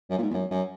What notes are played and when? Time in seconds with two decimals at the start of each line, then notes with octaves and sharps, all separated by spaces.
0.10 F#2
0.18 A#2
0.22 G#2
0.30 E2
0.34 F#2
0.51 F#2